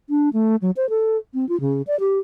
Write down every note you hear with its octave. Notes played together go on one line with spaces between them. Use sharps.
D4
A3
F#3
C5
A4
C4
F4
C#3
D5
G4